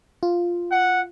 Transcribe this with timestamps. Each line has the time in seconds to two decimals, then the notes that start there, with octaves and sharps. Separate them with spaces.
0.23 F4
0.71 F#5